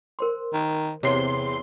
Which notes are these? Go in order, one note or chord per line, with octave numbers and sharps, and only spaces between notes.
A#4 C5 C6
D#3
E2 C3 C#5 F5 C6